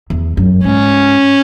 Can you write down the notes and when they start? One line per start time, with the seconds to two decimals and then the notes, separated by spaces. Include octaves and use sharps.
0.10 E2
0.37 F#2
0.64 G#2 C#4